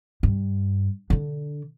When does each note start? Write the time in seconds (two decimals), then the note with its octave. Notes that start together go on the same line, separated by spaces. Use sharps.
0.23 G2
1.10 D3 D4